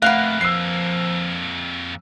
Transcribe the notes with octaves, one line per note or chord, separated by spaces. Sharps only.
F2 A3 A#3 B4 F5 F#5 F#6
F3 E6 C7